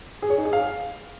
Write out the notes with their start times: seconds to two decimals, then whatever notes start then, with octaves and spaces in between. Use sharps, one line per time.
0.22 G#4
0.30 C#5
0.38 D#4
0.45 G#4
0.53 F5